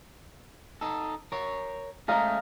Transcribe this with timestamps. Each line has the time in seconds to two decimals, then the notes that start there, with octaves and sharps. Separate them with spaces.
0.81 D#4 A4
1.32 A#4 C#5
2.08 G#3 A3 C#4 D#5 F5 A#5